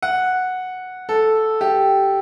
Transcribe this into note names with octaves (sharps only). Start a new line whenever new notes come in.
F#5
A4
G4